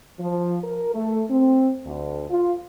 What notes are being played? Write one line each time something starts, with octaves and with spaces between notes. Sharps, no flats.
F3
A#4
A3
C4
D2
F4